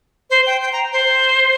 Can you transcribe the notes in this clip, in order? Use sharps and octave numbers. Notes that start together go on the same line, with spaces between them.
C5
G5
G5
A#5
C5